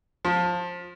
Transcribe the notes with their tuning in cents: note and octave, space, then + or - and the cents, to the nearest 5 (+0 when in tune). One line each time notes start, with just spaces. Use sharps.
F3 +20